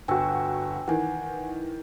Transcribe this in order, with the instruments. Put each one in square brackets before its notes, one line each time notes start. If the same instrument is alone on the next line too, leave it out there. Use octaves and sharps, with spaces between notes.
[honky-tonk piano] G1 F#4 [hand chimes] G5 G#5 E6
[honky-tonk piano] D#3 E3 [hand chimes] F#5 G#5